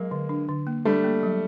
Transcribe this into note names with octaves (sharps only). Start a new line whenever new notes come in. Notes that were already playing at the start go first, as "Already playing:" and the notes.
Already playing: F#3 G#3 A#3
D3
D4
D3
A#3
G3 A3 D4
A#3
F#3